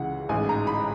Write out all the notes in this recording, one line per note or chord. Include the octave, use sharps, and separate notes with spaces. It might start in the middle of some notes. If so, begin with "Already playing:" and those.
Already playing: C#2 C#3 E3 F#5
A1 G#2 E3 G#5
A#5
B5